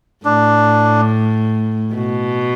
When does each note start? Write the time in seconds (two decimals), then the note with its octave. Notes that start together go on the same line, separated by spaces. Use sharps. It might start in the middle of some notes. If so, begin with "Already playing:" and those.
0.25 A2 D4
1.94 B2